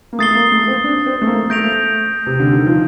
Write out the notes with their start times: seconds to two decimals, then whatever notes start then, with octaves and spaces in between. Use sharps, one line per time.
0.13 A#3
0.19 A3 D#6 A6 C7 G7
0.35 A#3
0.52 A3
0.68 C4
0.84 D4
1.06 C4
1.22 A3
1.27 A#3
1.50 A3 G6 A#6 D7 F7
2.26 C3
2.40 D3
2.53 D#3
2.66 F3